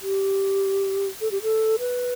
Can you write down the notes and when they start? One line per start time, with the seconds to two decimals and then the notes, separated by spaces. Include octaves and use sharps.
0.02 G4
1.21 A4
1.31 G4
1.43 A4
1.79 B4